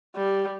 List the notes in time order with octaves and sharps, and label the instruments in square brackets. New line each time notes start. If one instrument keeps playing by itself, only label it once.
[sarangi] G3